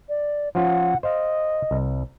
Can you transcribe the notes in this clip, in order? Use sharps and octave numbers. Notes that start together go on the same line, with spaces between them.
D5
F3 C#4 F4 F#5
C5 D#5 F5
C2